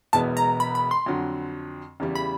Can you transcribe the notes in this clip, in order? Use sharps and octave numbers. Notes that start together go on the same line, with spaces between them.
E1 E2 B2 G#3 B3 A5
A#5
B5
B5
C6
F2 D3 F#3
E2 C#3 E3 G3
B5